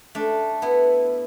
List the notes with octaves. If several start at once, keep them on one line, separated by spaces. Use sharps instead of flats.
A3 D4
B3 E4